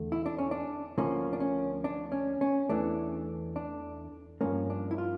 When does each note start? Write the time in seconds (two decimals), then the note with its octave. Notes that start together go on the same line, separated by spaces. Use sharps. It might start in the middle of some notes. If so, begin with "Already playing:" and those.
Already playing: E2 D3 A3
0.12 E4
0.26 D4
0.38 C#4
0.51 D4
0.98 D2 D3 F3 A#3 C#4
1.33 D4
1.40 C#4
1.84 D4
2.12 C#4
2.41 C#4
2.69 E2 E3 A3 D4
3.56 D4
4.41 G2 F3 A#3 C#4
4.70 D4
4.91 E4
4.98 F4